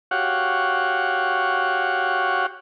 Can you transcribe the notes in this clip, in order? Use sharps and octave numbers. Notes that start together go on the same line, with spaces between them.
F#4 G4 C#5 F5 F#5